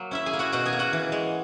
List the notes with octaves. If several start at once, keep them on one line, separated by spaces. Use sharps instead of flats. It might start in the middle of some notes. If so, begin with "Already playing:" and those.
Already playing: F#3 A#3
C#4 E4 E5
G#4 G#5
A#3
F#4 F#5
B2 F#4 F#5
G#4 G#5
A#3
F#4 F#5
E3
G#3